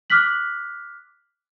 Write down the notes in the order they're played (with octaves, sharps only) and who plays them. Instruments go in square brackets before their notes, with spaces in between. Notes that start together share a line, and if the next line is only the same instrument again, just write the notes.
[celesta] D6 F6 F#6 B6 F#7